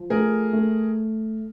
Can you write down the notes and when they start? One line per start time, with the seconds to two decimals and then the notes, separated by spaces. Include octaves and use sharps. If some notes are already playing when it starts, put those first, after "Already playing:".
Already playing: F3
0.10 A3 G#4 A#4
0.53 A3